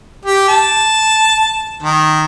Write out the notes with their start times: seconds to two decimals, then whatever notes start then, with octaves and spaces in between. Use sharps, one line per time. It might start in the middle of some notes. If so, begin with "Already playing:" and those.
0.25 G4
0.48 A5
1.82 D#3